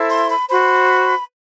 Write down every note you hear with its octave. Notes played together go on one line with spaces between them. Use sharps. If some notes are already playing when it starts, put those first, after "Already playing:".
Already playing: E4 A4 C5
C6
B5
F#4 C5 B5